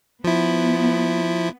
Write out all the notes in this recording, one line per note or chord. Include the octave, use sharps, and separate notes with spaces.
F3 B3 E4